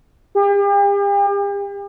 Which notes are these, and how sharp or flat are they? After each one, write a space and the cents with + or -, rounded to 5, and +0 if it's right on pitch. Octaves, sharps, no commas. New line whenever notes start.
G4 +40